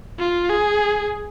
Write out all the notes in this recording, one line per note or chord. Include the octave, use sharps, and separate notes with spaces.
F4
G#4